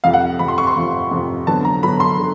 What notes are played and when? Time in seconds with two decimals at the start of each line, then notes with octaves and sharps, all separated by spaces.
0.04 F2 C3 F3 F5
0.14 F#5
0.39 F2 C3 F3 B5
0.48 C6
0.58 C#6
0.67 C6
0.76 F2 C3 F3
1.11 F2 C3 F3
1.47 D3 F#3 B3 A5
1.65 A#5
1.83 D3 F#3 B3 B5
2.00 C6
2.19 D3